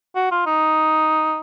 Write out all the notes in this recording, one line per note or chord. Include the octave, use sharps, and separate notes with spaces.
F#4
F4
D#4